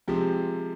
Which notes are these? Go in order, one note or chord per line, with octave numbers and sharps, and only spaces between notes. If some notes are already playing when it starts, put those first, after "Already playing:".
C3 F3 G#3 C4 G4